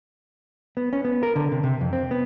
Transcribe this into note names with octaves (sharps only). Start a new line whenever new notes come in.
B3
C#4
B3
A#4
D3
C3
C3
F2
C4
B3